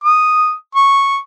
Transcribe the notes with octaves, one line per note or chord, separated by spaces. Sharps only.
D#6
C#6